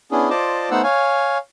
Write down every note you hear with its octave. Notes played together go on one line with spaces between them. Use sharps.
B3 C#4 D4 E4 G#4
F4 C5 D5 D#5 A5 D6
A3 B3 D#4 C5 F#5 E6
C#5 F5 G#5